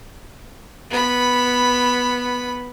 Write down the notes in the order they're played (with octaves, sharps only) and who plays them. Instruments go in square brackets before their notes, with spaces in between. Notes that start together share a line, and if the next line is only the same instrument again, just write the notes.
[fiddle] B3 B5